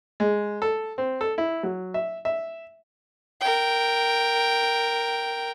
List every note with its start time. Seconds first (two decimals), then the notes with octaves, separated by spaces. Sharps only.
0.20 G#3
0.62 A4
0.98 C4
1.21 A4
1.38 E4
1.63 F#3
1.94 E5
2.25 E5
3.41 A#4 G5